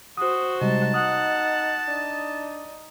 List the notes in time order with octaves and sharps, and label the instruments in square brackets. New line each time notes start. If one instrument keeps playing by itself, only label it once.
[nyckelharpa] F#4 C5 [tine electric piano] D#6
[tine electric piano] C3 G3 G#3 [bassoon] D#4 [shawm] A5
[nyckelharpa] F#5 [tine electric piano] D#6
[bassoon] D4 [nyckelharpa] D#4